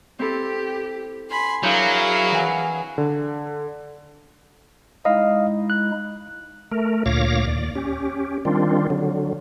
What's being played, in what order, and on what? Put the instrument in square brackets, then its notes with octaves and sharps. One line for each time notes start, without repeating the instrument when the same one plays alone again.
[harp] C4 E4 A4 [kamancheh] G4
[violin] G#5 C6 [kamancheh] B5
[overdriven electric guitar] F#3 [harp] D4 D#6 G6 [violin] E4 A#4 [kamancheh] G#4 F5
[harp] E3 F#5 G#5
[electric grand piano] D3
[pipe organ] G#3 D#4 E4 [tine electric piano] D#5 F5
[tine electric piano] F#6
[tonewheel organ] A3 A#4
D2 A#2 C#5 F5 D6 A#6
D#2 D5
C#4 G4
D#3 G3 C4 D4 F4
D3 F#3